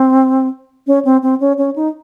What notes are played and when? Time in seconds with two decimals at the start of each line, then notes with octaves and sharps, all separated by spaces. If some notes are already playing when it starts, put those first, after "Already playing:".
Already playing: C4
0.87 C#4
1.05 C4
1.23 C4
1.40 C#4
1.58 C#4
1.76 D#4